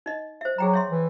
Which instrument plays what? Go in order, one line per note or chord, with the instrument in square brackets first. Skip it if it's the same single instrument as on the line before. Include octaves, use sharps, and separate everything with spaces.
[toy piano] D#4 D#5
C5 E5
[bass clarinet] F#3 [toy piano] G#4 G5 A#5
[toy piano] C#5 E5 C6
[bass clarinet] E3